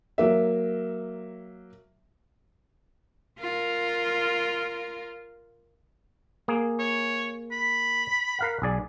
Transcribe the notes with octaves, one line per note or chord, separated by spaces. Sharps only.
F#3 A#3 E5
F4 A#4
A#3 G#4
C#5
B5
A#4 F5 F#5
B1 G#4 D5